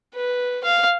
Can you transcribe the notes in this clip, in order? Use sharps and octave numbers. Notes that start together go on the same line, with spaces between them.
B4
F5